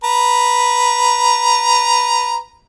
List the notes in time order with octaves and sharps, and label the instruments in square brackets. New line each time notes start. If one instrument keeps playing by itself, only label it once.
[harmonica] B4 A#5